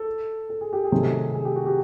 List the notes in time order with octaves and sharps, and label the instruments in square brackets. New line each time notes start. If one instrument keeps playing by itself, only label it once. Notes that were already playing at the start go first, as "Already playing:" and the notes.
Already playing: [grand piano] A4
A4
G#4
G4
G#4
[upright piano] C3 D#3 F#3 A3 C4
[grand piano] G#4
G4
F#4
G4